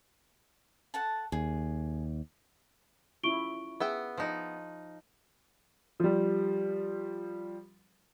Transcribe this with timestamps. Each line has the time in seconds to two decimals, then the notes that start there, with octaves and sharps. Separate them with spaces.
0.94 A4 F#5 A5
1.32 D#2 G#4
3.23 C#4 E4 F4 C#6 D7 G7
3.80 B3 G#4 E5 G5
4.17 F3 D#4
6.00 F3 G3